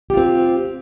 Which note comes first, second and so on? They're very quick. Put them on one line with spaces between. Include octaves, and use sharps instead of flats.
G4 F4 C4